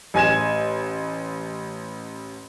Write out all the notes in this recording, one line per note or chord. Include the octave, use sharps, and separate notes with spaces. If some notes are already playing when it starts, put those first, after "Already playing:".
A1 G#5 G#6 E7